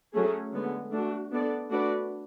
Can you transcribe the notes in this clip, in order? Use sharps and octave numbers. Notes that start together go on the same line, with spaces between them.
F#3 A3 C#4 G#4
D3 G#3 B3
A3 D4 F#4
B3 D4 A4 D5
A3 D4 F#4 B4 D5